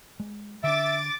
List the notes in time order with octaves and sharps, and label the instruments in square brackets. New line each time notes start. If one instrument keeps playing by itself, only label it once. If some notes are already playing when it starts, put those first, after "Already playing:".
[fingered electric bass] G#3
[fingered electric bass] D3 D4 [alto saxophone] E5 [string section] D6 A6